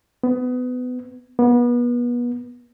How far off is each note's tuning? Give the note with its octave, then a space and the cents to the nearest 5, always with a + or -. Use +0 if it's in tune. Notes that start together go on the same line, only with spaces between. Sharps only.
B3 +25
B3 -30